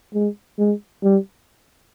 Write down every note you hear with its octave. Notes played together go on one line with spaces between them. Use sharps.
G#3
G#3
G3